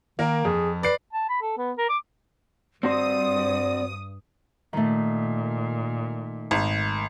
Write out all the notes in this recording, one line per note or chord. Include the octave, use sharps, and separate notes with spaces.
D#3 A#3 A#4
F2 G#4
B4 D5 C7
A5
B5
A4
B3
A#4
D6
G2 C4 F#4 C5 D5 D#6
A#2 D#3 A3
G#1